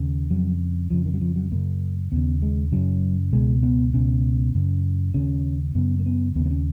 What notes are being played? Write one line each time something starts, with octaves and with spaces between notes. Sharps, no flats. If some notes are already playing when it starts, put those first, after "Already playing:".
Already playing: D#2 C#3
F2 C#3 F#3
F2 C#3 F3
D#3
F#3
F3
F#3
F#2 C#3 A#3
D#2 C#3 B3
G#3
F#2 C#3 F#3
C#2 B2 G#3
B3
C#2 B2 C#4
F#2 C#3
D#2 C#3 C#4
F#2 C#3 B3
A#3
B3
D#2 C#3 B3
B3
C#4